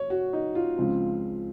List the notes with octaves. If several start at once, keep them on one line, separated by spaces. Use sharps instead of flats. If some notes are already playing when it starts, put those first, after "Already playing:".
Already playing: C#5
F#4
D#4
F4
C#2 C#3 F3 C4